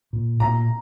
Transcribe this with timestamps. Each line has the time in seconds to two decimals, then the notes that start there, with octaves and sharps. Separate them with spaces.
0.13 A#2
0.40 A#2 A#5